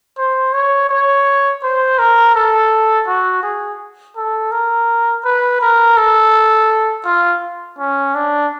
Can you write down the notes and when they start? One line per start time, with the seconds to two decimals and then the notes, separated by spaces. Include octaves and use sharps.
0.18 C5
0.53 C#5
0.89 C#5
1.63 C5
1.99 A#4
2.35 A4
3.07 F#4
3.43 G#4
4.17 A4
4.52 A#4
5.25 B4
5.62 A#4
5.97 A4
7.05 F4
7.79 C#4
8.15 D4